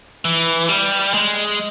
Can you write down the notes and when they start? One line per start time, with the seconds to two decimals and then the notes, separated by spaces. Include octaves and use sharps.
0.25 E3
0.69 G3
1.14 G#3